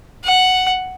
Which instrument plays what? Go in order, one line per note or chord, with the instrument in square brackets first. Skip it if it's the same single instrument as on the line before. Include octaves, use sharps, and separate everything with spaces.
[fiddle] F#5